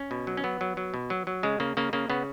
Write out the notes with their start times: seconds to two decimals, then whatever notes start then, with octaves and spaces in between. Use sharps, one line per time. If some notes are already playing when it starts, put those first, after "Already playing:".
Already playing: C#4
0.11 B2
0.27 F#3
0.37 C#4
0.44 F#3 B3
0.61 F#3
0.77 F#3
0.94 B2
1.10 F#3
1.27 F#3
1.43 C#3 G#3
1.60 C#3 A#3
1.77 C#3 A#3
1.93 C#3 A#3
2.10 C#3 B3